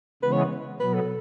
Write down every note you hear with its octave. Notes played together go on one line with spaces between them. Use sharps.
C#3 E3 G#3 B3 B4
C#5
B2 F#3 B3 B4
A4